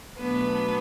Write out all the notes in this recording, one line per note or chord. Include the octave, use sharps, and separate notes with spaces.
B2 F#3 A3 B3 D4 B4